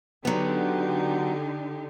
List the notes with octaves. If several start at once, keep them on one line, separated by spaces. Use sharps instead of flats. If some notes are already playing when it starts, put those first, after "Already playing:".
D3 F#3 B3 D#4 G4